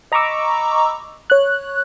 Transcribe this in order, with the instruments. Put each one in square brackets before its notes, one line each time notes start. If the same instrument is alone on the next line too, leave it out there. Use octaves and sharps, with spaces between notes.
[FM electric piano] D#5 A#5 B5 C#6 D6 E6
C#5 F#6